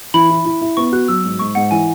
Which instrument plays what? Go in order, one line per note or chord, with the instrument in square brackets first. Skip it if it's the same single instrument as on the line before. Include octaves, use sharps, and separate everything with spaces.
[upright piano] E3 [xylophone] B5
[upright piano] E4
E4
E4
[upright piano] B3 [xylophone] C#6
[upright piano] F#4 [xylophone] F#6
[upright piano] F#3 [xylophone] E6
[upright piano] G#2
[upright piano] G#2 [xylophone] C#6
[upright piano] G#2 [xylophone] F#5
[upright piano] E3 [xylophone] G#5